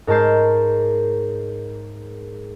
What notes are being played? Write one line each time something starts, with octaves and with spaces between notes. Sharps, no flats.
G#2 A#4 C#5 A5 G6 C7